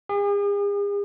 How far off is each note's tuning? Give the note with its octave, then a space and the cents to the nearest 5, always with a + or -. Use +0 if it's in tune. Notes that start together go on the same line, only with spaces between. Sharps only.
G#4 -45